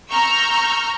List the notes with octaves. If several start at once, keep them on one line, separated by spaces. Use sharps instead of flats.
A#5 C#6 E6 F6 G6